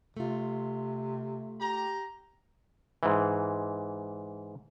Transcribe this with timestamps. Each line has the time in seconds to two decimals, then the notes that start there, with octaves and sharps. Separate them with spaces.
0.17 C3 A3 F4
1.60 G4 A#5
3.03 G#2 E3